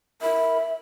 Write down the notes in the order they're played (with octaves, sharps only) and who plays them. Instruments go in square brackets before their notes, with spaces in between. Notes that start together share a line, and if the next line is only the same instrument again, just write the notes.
[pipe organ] A#4 B5 [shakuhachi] E5